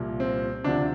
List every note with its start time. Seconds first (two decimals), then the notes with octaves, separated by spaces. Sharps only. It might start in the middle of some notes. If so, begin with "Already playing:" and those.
Already playing: C2 A#2 F3
0.20 C4
0.64 D2 C3 F3 D4